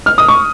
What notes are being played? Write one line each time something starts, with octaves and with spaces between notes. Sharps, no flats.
F6
D#6
C#6